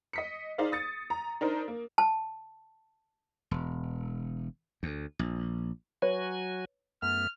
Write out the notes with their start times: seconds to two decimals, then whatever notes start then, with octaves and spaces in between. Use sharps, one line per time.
0.13 D#5 B6 C#7
0.58 D#4 G#4 C5 D5 F5
0.72 D#6 A6 C#7
1.10 A#5
1.41 D4 D#4 A#4 C5
1.68 A#3
1.98 A5
3.51 E1
4.83 D2
5.19 A#1
6.02 F#3 F#4 B4 C#5 G#5
7.02 F#2 A3 B3 F6